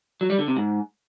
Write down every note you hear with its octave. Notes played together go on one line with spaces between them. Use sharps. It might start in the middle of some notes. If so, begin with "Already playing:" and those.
F#3
G3
D3
C3
G#2